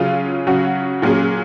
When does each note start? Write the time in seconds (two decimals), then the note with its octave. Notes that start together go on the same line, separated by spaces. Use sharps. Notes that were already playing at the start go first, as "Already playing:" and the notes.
Already playing: C#3 F#3 C#4 F4 G#4
0.47 C#3 F#3 C#4 F#4
1.02 A#2 F#3 C#4 G#4